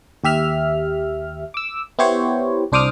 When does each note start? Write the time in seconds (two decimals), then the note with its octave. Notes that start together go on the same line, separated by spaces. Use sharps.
0.24 D#2 G4 E5 F6
1.54 D6 E6
1.99 B3 E4 G4 C5 C#5
2.72 C2 D4 C5 D6 D#6 F6